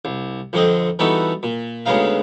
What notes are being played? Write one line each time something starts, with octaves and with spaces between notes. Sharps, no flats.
C2
F2 D3 C4 D#5
E3 G3 B3 D#4 F#4 A4
A#2
D2 C#3 G#3 B3 D#4 F5